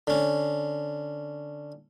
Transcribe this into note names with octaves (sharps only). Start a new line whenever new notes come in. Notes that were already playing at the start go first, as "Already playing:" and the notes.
D3 C#4